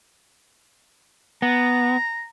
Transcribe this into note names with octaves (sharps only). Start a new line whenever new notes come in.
B3 A#5